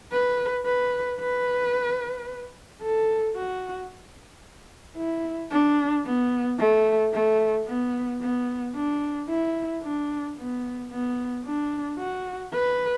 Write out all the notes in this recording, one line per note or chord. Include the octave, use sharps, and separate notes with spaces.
B4
B4
B4
A4
F#4
E4
D4
B3
A3
A3
B3
B3
D4
E4
D4
B3
B3
D4
F#4
B4